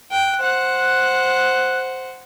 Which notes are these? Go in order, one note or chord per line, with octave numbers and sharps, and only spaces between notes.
G5 F#6
C5 F#5